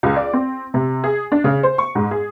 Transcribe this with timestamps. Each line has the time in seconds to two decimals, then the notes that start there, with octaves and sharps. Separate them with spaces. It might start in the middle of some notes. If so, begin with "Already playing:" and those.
0.03 C#2
0.16 D5
0.33 C4
0.74 C3
1.04 G#4
1.32 D4
1.44 C#3
1.63 C5
1.78 C#6
1.95 G#2
2.11 G#4